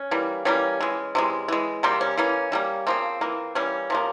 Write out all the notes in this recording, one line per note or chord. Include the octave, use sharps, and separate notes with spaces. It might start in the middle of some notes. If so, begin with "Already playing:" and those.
Already playing: C#4
E3 G3 A#3
E3 G3 A#3 C#4
E3 G#3
C3 E3 G#3
E3 G#3
C3 G3 A#3 C4
C#4
E3 A#3 C#4
E3 G3 A#3
C#3 F3 A#3 C4
E3 A#3
E3 G3 A#3 C#4
C3 F3 A#3